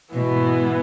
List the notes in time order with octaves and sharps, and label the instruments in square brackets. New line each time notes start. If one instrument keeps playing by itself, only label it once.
[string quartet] G#2 E3 B3 [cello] B2